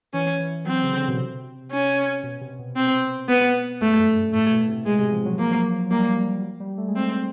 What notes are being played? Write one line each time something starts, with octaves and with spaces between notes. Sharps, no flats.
E3 C#4
E3
F#3 C4
C#3
D3
B2
C3
C#4
B2
C3
B2
C4
B3
G2 A3
F#2
G2
A2 A3
B2
C3
B2 G#3
C3
F3
F#3
F3 A#3
F#3
G3 A#3
G3
A3
G#3
A3 C4